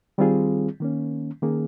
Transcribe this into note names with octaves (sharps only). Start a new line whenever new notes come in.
D#3 G3 C4 F4 G#4
D#3 A#3 C#4
D#3 A#3 C#4 G#4